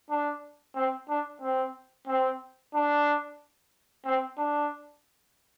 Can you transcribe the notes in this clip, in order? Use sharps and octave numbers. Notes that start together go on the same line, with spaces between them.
D4
C4
D4
C4
C4
D4
C4
D4